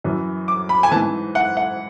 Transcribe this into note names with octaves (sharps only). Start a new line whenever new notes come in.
F#2 E3
D6
B5
G#5
G#2 E3 A5
F#5
F#5